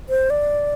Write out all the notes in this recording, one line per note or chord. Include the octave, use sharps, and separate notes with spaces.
C5
D5